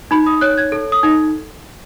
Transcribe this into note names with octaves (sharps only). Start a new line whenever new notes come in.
D#4 B5
D#6
C#5 F#6
G#6
A4
D#6
D#4